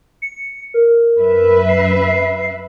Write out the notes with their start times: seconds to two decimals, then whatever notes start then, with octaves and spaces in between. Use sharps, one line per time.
0.22 C#7
0.74 A#4
1.18 F#2 B4 E5
1.69 C7